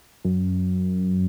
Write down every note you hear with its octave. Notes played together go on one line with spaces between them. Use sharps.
F#2